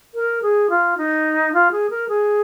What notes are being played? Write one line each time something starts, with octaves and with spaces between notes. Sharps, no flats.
A#4
G#4
F4
D#4
F4
G#4
A#4
G#4